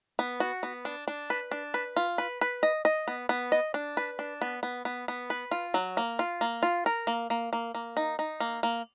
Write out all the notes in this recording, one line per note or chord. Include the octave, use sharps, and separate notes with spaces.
B3
F#4
B3
D4
D4
B4
D4
B4
F4
B4
B4
D#5
D#5
B3
B3
D#5
D4
B4
D4
B3
B3
B3
B3
B4
F4
F#3
A#3
F4
A#3
F4
A#4
A#3
A#3
A#3
A#3
D#4
D#4
A#3
A#3